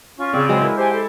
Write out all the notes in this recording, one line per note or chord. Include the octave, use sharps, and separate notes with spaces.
C#4 F4 C#6
C#3 C4 D5
F#3 G#3 F4 B4 C5 G5
E4 A#4 B4
G4 C5 F#5 G#5 A5
E4 A4